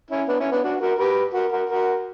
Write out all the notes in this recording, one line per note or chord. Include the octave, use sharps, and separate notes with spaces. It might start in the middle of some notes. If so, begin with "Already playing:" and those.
C#4 E4
B3 D4
C#4 E4
B3 D4
D4 F#4
F#4 A#4
G4 B4
F#4 A#4
F#4 A#4
F#4 A#4